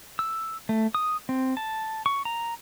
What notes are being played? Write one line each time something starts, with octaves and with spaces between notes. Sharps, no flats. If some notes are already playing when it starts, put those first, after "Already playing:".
E6
A3
D#6
C4
A5
C#6
A#5